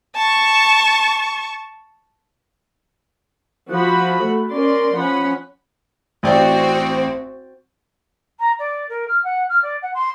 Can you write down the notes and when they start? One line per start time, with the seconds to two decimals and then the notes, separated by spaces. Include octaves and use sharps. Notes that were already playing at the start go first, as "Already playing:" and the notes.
0.16 A5 C#6
3.70 F3 F#4 F#5 B5
4.25 A3
4.54 C#4 A#4 D5 C6
4.97 F3 C#4 F#5 B5
6.23 A1 C4 F#4 D5 G5
8.39 A#5
8.59 D5
8.89 A#4
9.08 F6
9.24 F#5
9.49 F6
9.62 D5
9.82 F#5
9.94 C6